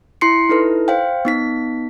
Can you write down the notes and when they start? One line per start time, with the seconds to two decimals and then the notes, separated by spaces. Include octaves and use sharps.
0.21 E4 C6 C7 C#7
0.49 D#4 E4 A4 B4
0.88 C5 F5 G5
1.25 B3 D#4 B6